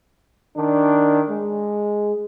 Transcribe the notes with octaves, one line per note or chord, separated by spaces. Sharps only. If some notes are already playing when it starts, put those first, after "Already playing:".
D#3 D4
G#3